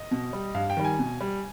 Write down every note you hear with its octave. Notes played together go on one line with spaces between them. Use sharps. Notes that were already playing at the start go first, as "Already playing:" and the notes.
Already playing: D#5
B2
G3
G2 F5
G5
D#3 G3
G#5
B2
G3